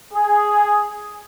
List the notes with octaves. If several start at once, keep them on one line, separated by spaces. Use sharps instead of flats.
G#4